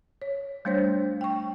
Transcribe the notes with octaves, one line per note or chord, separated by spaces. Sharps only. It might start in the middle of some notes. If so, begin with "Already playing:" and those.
C#5
G3 A3 D4 C5 C#5
G5 C#6